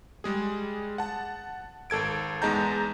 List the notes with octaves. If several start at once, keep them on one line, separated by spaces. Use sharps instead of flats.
G3 G#3 G#4
F#5 A5
G#1 A4 G#6 D7
E2 G#3 D#4 A5 A#5 G6